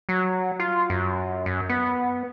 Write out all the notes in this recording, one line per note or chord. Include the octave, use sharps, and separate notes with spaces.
F#3
F4
F#2
F#2
B3